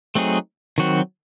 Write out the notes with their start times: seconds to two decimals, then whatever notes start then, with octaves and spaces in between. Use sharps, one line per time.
0.15 F#3 A3 C4 D#4 G#4
0.78 D#3 F#3 C4 F#4